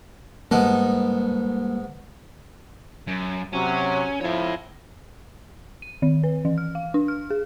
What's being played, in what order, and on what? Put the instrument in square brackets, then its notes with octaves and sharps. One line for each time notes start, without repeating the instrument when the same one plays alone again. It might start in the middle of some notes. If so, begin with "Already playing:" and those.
[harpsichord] G#2 B3 A4 [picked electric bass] G3 A#3
[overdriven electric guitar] F#2
[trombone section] C3 F#3 [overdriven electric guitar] C#4
[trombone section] F2 F3 E4 [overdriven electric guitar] C#5 E5
[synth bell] D#7
D#3
B4
E3
F6
F5
D4
F6
G#4